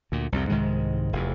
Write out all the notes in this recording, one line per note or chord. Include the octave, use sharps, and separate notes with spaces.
D2 A#2
C2 F2 C3
C2 G#2 D#3 G#3
F1 E2